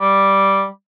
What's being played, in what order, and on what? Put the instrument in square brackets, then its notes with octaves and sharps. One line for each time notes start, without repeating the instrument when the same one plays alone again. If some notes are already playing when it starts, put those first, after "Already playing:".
[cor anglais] G3